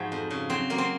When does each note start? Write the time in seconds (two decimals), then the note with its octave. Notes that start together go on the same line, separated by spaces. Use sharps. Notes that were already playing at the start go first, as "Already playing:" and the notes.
Already playing: G#2 F3 F#4 G#4
0.12 F2
0.31 C#3
0.50 F#3 C4
0.70 F#3 A#3
0.78 C4